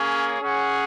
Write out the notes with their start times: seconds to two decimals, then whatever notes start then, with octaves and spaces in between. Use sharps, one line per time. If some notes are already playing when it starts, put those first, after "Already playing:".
Already playing: A#3 C#4 G#4 C#5
0.41 C#4 G#4 C#5 F#5